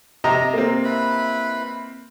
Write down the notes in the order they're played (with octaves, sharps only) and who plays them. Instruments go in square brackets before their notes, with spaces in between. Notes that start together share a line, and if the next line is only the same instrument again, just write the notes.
[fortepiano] C3 D#5 A#5
[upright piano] A#3 C4
[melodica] E4 B4 B5